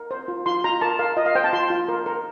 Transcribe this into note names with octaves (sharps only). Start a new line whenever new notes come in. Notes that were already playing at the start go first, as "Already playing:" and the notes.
Already playing: A#4
C5
F4
F4 C6
F4 A#5
A#4 A5
A#4 F5
F4 D#5
F5
C5 G5
A5
F4 C6
F4
A#4
A#4